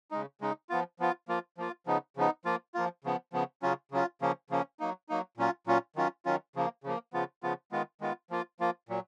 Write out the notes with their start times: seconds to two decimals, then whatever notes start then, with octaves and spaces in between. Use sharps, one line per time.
0.11 C#3 G#3 D#4
0.41 C#3 G#3 D#4
0.70 F3 B3 F4
0.99 F3 B3 F4
1.28 F3 A#3 F4
1.58 F3 A#3 F4
1.86 C#3 F3 B3 D#4
2.17 C#3 F3 B3 D#4
2.45 F3 A#3 F4
2.75 F3 A#3 F4
3.04 C#3 F3 B3
3.33 C#3 F3 B3
3.63 C#3 F#3 C#4 F4
3.91 C#3 F#3 C#4 F4
4.21 C#3 F3 A#3 C#4
4.50 C#3 F3 A#3 C#4
4.80 F#3 A#3 D#4
5.09 F#3 A#3 D#4
5.37 A#2 F#3 C#4 F4
5.67 A#2 F#3 C#4 F4
5.96 D#3 F#3 C#4 F4
6.25 D#3 F#3 C#4 F4
6.56 C#3 F3 A#3
6.84 C#3 F3 A#3
7.13 C#3 F3 B3 F4
7.43 C#3 F3 B3 F4
7.72 D#3 G#3 B3 F4
8.01 D#3 G#3 B3 F4
8.30 F3 A#3 F4
8.60 F3 A#3 F4
8.89 A#2 F#3